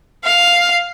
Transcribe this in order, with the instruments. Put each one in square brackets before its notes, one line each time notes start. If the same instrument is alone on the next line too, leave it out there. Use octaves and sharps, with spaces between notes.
[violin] F5